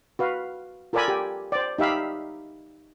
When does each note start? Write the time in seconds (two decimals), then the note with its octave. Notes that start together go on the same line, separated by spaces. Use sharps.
0.19 F#4 B4 F5
0.93 F4 A4 A#4 D5 G#5 B5
1.08 G4
1.52 C5 D5
1.78 D#4 G4 E5 F5 B5